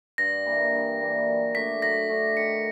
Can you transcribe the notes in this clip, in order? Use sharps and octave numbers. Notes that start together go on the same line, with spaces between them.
G2 A#6
E3 G3 A#3
G2
E3 G3 A#3
F#3
A3 D4 G4 B6
F#3 A#6
A3 D4 G4
D#3 C#7